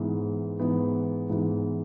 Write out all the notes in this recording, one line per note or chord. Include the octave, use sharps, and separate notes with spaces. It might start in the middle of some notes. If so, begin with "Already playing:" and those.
Already playing: G#2 E3 B3
G#2 E3 B3
G#2 E3 B3